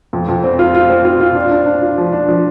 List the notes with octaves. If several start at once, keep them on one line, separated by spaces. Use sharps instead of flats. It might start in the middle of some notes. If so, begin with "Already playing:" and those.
F2
F2
C4
F4
F4
C4
F4
F4
D4
D4
D4
F4
F3
D4
F3